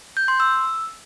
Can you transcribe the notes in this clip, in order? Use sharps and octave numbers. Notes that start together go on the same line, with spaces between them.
G6
C6
E6